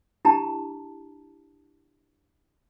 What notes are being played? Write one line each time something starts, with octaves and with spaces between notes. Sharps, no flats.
D4 E4 G4 A5 A#5